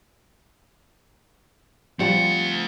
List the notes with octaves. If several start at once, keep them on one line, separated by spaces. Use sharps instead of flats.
F3 G3 A3 C4 F#5